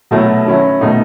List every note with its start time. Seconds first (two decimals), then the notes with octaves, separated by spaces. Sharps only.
0.11 B2 F#3 A3 E4
0.46 D#3 F#3 C#4 E4
0.81 B2 A3 D#4